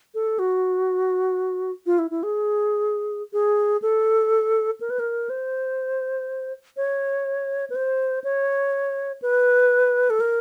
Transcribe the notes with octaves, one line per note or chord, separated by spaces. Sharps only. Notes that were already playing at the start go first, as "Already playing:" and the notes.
A4
F#4
F4
E4
E4
G#4
G#4
A4
A#4
B4
A#4
C5
C#5
B4
C5
C#5
B4
A4
A#4